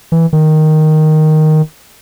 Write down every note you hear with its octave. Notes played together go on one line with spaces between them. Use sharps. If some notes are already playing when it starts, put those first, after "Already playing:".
E3
D#3